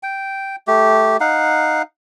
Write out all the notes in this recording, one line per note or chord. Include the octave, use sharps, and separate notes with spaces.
G5
A3 G4
D#4 F5 F#5